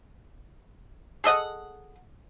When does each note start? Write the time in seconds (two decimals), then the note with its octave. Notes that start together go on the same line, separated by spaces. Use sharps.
1.24 G#4 A4 D#5 F#5